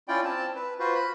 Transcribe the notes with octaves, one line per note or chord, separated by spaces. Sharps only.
C#4 E4 F4 D5 G5
C4 A5
B4
F4 F#4 B4 C5
B5 F#6